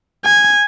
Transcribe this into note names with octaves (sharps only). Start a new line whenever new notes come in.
G#5